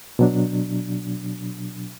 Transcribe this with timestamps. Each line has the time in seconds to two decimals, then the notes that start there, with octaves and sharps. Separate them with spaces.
0.19 B2 F#3 D4